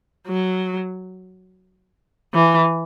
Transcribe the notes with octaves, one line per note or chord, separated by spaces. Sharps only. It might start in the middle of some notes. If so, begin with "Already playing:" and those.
F#3
E3